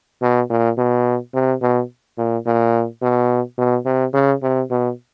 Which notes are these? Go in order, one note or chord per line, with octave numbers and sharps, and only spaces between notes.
B2
A#2
B2
C3
B2
A#2
A#2
B2
B2
C3
C#3
C3
B2